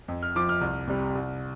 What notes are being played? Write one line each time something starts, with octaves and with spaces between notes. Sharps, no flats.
F2
F6
F3 D6
F6
C2
C3 G3
C2